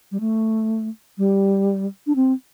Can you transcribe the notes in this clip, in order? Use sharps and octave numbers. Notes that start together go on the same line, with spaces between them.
G3
A3
G3
D4
C4